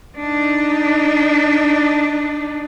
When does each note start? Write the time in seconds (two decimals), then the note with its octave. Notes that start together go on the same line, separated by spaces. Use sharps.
0.18 D4 D#4